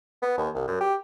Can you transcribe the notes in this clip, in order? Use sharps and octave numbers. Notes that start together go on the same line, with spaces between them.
B3
D#2
C2
F#2
G4